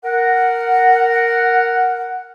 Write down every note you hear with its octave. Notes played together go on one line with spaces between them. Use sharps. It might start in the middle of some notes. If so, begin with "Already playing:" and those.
A#4 F#5